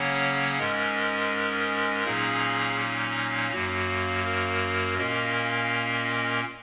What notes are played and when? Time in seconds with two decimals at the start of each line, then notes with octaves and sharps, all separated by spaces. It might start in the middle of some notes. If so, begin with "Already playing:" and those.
Already playing: C#3 F#3 A#3 C#4 C#5 F#5
0.58 G#2 G#3 C#4 A#4 D#5
2.05 A#2 F#3 A#3 C#4 D#4 G#4
2.78 D#4
3.51 F#2 F#3 A#3 F#4
4.25 F#4 A#4
4.98 A#2 A#3 C#4 A#4 D#5